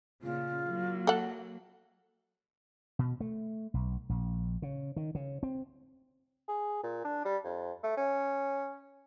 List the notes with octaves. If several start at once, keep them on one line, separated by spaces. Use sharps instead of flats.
A#2 C#3 F4
F#3 A#3
A4 F#5
B2
A3
B1
A#1
C#3
D#3
C#3
C4
G#4
A#2
D4
G3
F2
A3
C#4